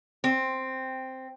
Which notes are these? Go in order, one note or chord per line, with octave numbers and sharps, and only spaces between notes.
C4